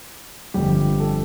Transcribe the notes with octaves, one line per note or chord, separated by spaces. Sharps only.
G1 F2 D3 G3 G4
A4